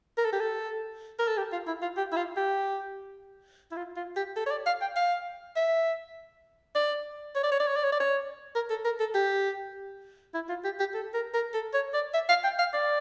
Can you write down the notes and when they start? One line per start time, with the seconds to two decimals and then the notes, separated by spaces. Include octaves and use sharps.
0.18 A#4
0.25 A4
0.32 G4
0.40 A4
1.19 A#4
1.28 A4
1.37 G4
1.52 F4
1.67 E4
1.82 F4
1.97 G4
2.12 E4
2.17 F4
2.37 G4
3.72 E4
3.77 F4
3.96 F4
4.17 G4
4.36 A4
4.46 C#5
4.51 D5
4.66 F5
4.81 G5
4.96 F5
5.57 E5
6.75 D5
7.35 C#5
7.43 D5
7.52 C#5
7.60 D5
7.68 C#5
7.76 D5
7.84 C#5
7.92 D5
8.00 C#5
8.55 A#4
8.70 A4
8.85 A#4
9.00 A4
9.15 G4
10.34 E4
10.49 F4
10.65 G4
10.80 G4
10.94 A4
11.14 A#4
11.34 A#4
11.54 A4
11.74 C#5
11.94 D5
12.14 E5
12.29 F5
12.44 G5
12.59 F5
12.74 D5